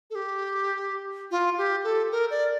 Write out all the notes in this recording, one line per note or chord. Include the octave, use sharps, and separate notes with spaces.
A4
G4
F4
G4
A4
A#4
D5